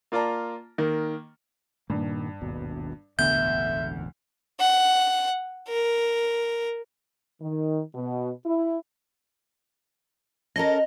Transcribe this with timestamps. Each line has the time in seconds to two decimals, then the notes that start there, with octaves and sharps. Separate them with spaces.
0.12 A#3 F4 D5 A5 A#5
0.78 D#3 A#3
1.90 G2 A#2 D#3 A#3
2.41 G#1 D#2 B2
3.19 E1 A1 D2 B3 E5 G6
4.60 F#5
5.68 A#4
7.41 D#3
7.95 B2
8.46 E4
10.56 C#4 A4 A#4 D#5